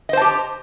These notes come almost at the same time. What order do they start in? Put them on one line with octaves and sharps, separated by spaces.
D#5 C5 A5 G4